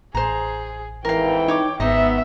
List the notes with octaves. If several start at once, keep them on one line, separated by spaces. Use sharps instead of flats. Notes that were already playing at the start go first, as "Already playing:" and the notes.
A1 G#4 C5 A#5
F2 G#2 E3 A#4 F5 G5
D#4 C#5 D6
G#1 G#2 B3 D#4 D#5 E5